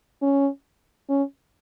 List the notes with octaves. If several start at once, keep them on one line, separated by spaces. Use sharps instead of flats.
C#4
C#4